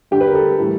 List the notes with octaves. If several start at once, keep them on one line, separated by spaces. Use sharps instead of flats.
G2 D3 G3 G4
B4
A#4
A4
A2 E3 G3